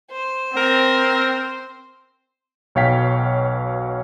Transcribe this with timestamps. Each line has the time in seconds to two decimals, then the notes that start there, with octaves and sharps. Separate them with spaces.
0.11 C5
0.57 C4 A#4
2.75 B1 B2 C#5 F5 G5 B6